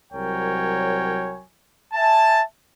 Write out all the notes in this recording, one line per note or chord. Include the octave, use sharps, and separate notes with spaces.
C2 F#3 A#4 C#5 G5 G#5
E5 G#5 A5